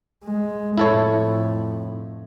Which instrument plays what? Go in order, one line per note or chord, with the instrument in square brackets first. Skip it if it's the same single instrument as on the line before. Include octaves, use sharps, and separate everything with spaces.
[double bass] G#3
[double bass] F2 A2 [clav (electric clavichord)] E4 A4 C#5